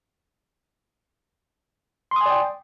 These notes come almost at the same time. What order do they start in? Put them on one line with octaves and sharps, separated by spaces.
C6 D#6 G#5 D5 G5